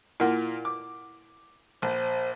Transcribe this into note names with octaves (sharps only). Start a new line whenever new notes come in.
A#2 A#3 E4 F4 A#4 F#5
D6
A#1 C5